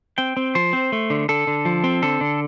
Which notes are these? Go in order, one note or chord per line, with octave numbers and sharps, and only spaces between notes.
C4 G5
C4
F3 C5
C4
A3
D3
D3 A4
D3
F3
C4
D3 A4
D3